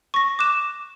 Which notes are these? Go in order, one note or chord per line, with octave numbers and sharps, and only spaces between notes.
C#6 A#6
D6 F#6 E7